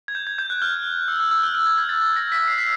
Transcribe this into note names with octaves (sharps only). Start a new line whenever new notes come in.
G#6
G6
G#6
G6
F#6
F6
E6
E6
E6
F6
F6
G#6
G#6
A6
A6
A#6
B6
C7
B6